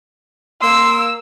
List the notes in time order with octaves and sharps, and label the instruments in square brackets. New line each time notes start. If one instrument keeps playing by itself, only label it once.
[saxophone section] A#3 [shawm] C6 [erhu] E6